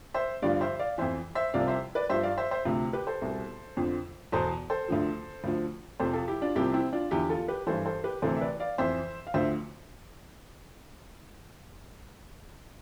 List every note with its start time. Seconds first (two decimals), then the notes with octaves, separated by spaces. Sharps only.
0.14 C5 E5
0.42 G2 D3 F3 D5 F5
0.61 C5 E5
0.79 D5 F5
0.98 F2 E3 C5 E5
1.35 C5 E5
1.54 C2 C3 F3 D5 F5
1.68 C5 E5
1.95 B4 D5
2.10 G2 F3 C5 E5
2.23 D5 F5
2.38 C5 E5
2.51 C5 E5
2.65 D2 C3 F3
2.93 G4 B4
3.07 A4 C5
3.22 C2 B2
3.77 F2 D3 F3
4.32 E2 B2 A4 C5
4.70 A4 C5
4.88 D2 D3 F3
5.44 D2 D3 F3
5.99 F2 C3 F3 A4 C5
6.13 F4 A4
6.28 E4 G4
6.41 D4 F4
6.55 C2 C3 F3 E4 G4
6.74 C4 E4
6.93 D4 F4
7.11 E2 D3 F3 E4 G4
7.29 F4 A4
7.48 G4 B4
7.67 G2 E3 A4 C5
7.85 A4 C5
8.04 G4 B4
8.22 D2 C3 E3 A4 C5
8.36 E5
8.41 B4 D5
8.60 D5 F5
8.78 F2 E3 C5 E5
9.27 F5
9.34 D2 D3 F3 C5 E5